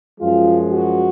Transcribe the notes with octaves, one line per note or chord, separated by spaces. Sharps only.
F#2 F3 G#3 F4
F#4